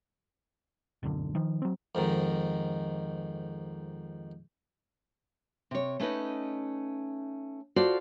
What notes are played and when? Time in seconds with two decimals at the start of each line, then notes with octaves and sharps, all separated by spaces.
1.03 D1 B1 F#2 D3
1.35 D#3 F3
1.62 F#3 C4
1.95 F2 G#2 D#3
5.71 C3 C#5
6.00 A3 C#4 D#4 B4 D#5
7.76 F4 F#4 A4 C5 D5